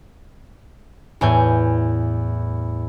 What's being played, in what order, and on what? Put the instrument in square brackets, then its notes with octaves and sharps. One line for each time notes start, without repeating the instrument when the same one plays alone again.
[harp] E2 A2 G#5 G6